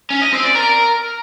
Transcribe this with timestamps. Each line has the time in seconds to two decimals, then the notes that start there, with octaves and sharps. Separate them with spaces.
0.10 C#4
0.22 D#5
0.33 C4
0.44 D5
0.55 A#4